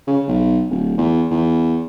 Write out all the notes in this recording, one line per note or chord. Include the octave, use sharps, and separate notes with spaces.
C#3
B1
D1
E2
E2